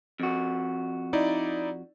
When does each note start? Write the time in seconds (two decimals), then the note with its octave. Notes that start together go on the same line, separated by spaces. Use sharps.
0.20 F2 F#4
1.13 D#4 E4 D5